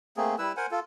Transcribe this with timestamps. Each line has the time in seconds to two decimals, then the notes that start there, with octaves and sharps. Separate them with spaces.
0.17 A3 A#3 C4 G#4
0.38 G3 E4 B4 E6
0.57 A#4 C5 F#5 G#5
0.71 F4 A4